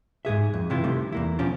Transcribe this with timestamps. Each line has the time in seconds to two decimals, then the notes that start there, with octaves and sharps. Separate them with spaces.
0.25 G#2 B2 G#4 E5
0.54 F2
0.70 C3 E3 E4 F4
0.84 C3 D#3 G3 A3
1.12 E2 A#3 E4
1.39 B2 F3 C#4 D4